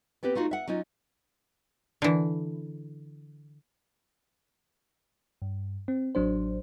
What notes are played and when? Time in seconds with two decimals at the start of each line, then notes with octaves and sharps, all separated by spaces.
0.23 B3 C4 G4 B4
0.35 A3 D#4 F4 F#4
0.51 E5 F#5
0.68 F#3 C#4 D#4 F4
2.02 D3 E3
5.42 G2
5.88 C4
6.15 A1 F#3 D4 C5